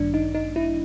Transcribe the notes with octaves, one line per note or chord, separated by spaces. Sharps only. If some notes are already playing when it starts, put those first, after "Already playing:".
Already playing: A1 G2 D#3 G3 A#3 D4
D#4
D#4
E4